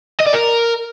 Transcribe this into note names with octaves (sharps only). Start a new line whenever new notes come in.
D#5
D5
A#4